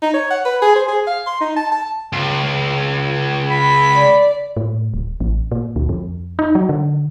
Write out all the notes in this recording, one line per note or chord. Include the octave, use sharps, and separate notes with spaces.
D#4
C#5
F#5
B4
G#4
C5
G#4
F5
C6
D#4
A5
A5
C#2
B5
D5
A2
D1
A1
A#2
D2
F2
D#4
F#3
D3